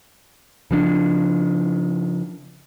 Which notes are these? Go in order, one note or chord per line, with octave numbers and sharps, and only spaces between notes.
C#3 F3 D4